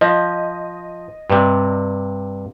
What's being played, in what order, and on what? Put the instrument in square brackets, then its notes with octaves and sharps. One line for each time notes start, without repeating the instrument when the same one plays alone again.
[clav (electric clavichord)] F3 [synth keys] D#5
[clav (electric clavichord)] G2 C3